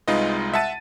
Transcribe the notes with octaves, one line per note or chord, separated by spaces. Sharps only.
C2 G#3 D#4 F4 B4 D#5
E5 F#5 A5 A6 D#7